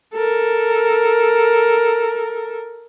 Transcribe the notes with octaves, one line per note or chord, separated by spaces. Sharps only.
A4 A#4